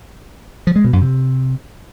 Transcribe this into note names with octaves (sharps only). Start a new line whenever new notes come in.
F3
G#3
B2
F#2
C3